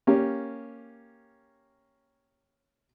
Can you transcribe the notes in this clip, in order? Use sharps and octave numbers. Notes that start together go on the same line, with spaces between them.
A#3 C#4 G4